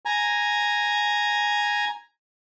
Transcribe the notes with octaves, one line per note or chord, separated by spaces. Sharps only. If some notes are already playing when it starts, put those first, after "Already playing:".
G#5 A#5